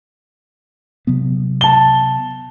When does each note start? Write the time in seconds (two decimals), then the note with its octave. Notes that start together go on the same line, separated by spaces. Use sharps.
1.07 C3 F#3 B3
1.61 A5 G7